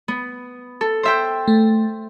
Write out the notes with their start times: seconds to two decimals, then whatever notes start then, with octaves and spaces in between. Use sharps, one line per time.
0.08 B3
0.81 A4
1.03 C5 E5 G5
1.48 A3